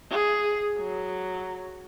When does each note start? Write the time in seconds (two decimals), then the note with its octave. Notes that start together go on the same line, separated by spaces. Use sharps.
0.11 G#4
0.78 F#3